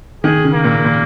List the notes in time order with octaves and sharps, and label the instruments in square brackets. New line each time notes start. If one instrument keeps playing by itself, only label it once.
[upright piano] D#3 [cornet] G#4
[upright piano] C#3
[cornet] A#3
[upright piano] A#2
A#2